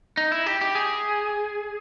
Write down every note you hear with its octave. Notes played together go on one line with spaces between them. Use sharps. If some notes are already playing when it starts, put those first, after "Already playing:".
D#4
E4
G4
G4
G#4